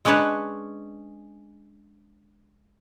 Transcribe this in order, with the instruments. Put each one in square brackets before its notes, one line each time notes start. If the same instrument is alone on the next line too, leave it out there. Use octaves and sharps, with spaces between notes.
[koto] G#3 C#4 D4 B4 C#5 A5